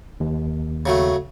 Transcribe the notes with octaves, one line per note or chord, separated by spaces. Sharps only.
D#2
C#3 F#3 A3